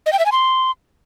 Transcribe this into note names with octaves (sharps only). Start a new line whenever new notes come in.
D#5
G5
E5
G#5
C6